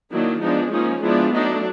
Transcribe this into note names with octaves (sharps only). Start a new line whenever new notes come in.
D#3 F#3 A#3 D4 E4
F3 G#3 B3 D4 D#4
F3 A#3 C#4 D#4
F3 G#3 B3 D4 E4
F#3 A3 D4 D#4